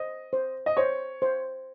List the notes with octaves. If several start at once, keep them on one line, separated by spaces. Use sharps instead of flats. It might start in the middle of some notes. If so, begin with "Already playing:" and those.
Already playing: C5 D#5
C5
D#5
C5 C#5
C5